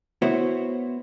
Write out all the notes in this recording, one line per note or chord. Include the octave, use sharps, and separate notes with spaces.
B3 E4 F#4 C5 C#5